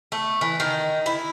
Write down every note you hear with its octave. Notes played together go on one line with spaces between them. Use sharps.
A3
E3
D#3
E4